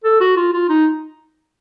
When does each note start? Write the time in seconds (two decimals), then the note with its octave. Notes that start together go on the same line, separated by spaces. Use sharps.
0.04 A4
0.21 F#4
0.37 F4
0.53 F4
0.69 D#4